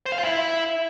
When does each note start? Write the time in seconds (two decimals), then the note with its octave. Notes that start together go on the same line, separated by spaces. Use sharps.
0.06 C5
0.12 F5
0.18 F4
0.24 E4